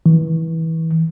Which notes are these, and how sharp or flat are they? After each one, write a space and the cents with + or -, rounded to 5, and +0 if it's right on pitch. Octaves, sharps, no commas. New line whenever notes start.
E3 -25